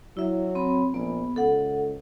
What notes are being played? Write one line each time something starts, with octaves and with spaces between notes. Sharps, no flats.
F#3 E4 E5
C4 B5
A#1 B3
C#2 A4 F#5